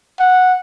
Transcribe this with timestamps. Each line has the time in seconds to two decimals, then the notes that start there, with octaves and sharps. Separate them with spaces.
0.20 F#5